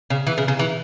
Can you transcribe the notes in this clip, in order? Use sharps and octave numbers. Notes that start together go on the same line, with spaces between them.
C#3
E3
C#3
C#3
E3